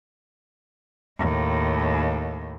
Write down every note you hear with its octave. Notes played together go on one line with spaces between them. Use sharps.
D#2 A2